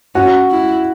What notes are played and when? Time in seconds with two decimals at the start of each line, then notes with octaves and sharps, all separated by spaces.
0.15 C#4 F#4
0.50 E4